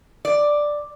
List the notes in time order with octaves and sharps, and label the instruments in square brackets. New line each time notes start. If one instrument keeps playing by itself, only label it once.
[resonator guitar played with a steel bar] D5